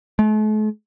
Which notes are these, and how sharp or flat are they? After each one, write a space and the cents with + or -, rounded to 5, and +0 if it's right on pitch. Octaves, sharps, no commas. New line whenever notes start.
A3 -45